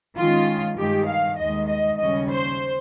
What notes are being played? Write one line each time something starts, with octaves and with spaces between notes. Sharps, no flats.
D#3 G#3 C#4 F4
G2 D#3 G#3 G4
F5
D#2 D#3 G#3 D#5
D#5
D#2 C#3 G3 C#4 D#5
C5